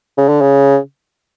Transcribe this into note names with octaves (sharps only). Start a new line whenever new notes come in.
C#3
D3
C#3